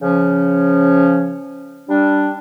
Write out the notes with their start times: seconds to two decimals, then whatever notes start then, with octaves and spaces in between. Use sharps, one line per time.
0.01 C#3 F3 C#4
1.89 G3 D4